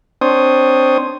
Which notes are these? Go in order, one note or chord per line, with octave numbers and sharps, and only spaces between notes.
C4 D4 C5 C#5 D#6